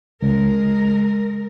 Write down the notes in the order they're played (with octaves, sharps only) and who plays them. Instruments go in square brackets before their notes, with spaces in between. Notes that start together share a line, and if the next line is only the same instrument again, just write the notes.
[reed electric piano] C#2 [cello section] G#3 A#4